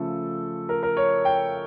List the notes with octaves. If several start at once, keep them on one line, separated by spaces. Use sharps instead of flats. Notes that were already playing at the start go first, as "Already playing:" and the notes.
Already playing: C#3 F3 A3 A4
A#4
A#4
C#5
G5